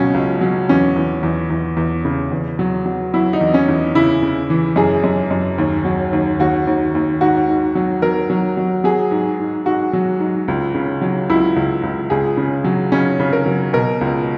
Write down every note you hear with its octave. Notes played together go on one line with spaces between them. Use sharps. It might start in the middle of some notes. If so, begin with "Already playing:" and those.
Already playing: C#2 B2 F#3 C#4
C#2
F#3
E2 C#4
E2
E2
E2
E2
C#3
E2
F#3
F#3
F#3 E4
D#4
E2
C#4
E2
C#3 E4
C#3
E3
F#2 G#4
F#2
F#2
D#2
F#3
D#2
D#2 F#4
D#2
D#2
G#2 F#4
G#2
F#3
F#3 A#4
F#3
F#3
F#3 G#4
G#2
G#2
G#2 F#4
F#3
G#2
C#2
C#3
F#3
C#2 E4
C#2
C#2
C#2 G#4
C#3
F#3
C#3 C#4
C#3
A#4
F#3
B2 A#4
C#2